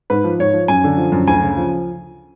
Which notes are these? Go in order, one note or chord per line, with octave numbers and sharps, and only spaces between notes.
G#2 B4
F3
G#2 C#5
F3
F#2 G#5
D3
F3
F#2
D2 G#5
C#3
F3